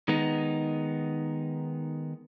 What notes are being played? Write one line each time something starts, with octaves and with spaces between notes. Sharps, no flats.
D#3 G#3 B3 D#4